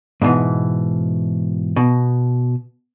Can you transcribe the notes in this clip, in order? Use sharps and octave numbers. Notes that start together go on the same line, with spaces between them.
G#2 B2 D#3 E3
B2